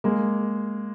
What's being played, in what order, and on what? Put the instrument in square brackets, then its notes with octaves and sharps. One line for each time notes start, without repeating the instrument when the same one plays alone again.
[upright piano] G#3 A#3